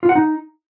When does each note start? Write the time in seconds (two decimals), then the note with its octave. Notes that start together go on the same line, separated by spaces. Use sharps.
0.03 F4
0.09 F#5
0.15 D#4